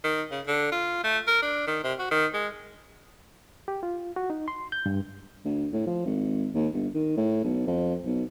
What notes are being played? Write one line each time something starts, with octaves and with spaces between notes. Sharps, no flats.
D#3
C#3
D3
F4
A3
A#4
D4
D#3
C3
F#4
D#3
G#3
G4
F4
F#4
D#4
C6
G6
G2
D2
A2
F3
G#1
D#2
G1
D#3
A2
B1
F2
B1